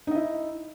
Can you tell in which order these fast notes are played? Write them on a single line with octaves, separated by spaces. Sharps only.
D#4 D#5 E4